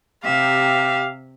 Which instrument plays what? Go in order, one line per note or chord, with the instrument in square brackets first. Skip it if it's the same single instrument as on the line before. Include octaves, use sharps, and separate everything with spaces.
[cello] C3 E5 [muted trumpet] G4 [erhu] F5